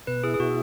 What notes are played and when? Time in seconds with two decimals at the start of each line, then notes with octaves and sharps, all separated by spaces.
0.07 B2 B4
0.24 E4 G#4
0.34 G#4
0.40 B2 F#4